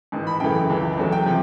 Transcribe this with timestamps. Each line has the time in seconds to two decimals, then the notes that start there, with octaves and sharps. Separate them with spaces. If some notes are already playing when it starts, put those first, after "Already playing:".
0.12 A1 G#2 D#3
0.27 B5
0.40 F#2 C#3 E3 A3 G5
0.70 C#2 C#3 E3
0.97 E2 C#3 F#3 A3
1.12 G5
1.26 C3 F3